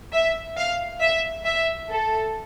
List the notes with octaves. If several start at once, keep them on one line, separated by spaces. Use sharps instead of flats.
E5
F5
E5
E5
A4